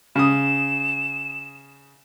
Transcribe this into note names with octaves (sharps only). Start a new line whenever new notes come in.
C#3 D#6 E7